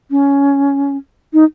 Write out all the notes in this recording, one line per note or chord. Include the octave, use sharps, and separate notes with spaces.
C#4
D#4